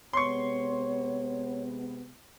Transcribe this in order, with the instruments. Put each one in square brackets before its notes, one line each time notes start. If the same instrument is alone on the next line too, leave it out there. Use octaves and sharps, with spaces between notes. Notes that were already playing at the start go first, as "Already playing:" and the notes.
[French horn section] C3 G#3 B3 [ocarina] C#5 [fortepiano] C6 C#6